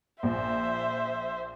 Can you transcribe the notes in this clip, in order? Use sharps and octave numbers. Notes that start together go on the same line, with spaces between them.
A#1 A#2 C5 E5